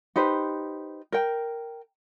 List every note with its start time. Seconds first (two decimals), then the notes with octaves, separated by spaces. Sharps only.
0.16 D#4 G4 B4 C5
1.12 A#4 G5